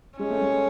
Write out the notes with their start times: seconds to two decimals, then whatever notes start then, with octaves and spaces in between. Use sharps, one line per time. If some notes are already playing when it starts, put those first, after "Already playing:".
0.19 G#3 C#4
0.30 A3
0.41 G#3